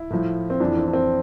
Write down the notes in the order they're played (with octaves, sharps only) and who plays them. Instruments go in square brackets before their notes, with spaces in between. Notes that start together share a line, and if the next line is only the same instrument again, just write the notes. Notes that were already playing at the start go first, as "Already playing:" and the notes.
Already playing: [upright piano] E4
A2 F3
C4
F2 E3 D4
C4
D4
C4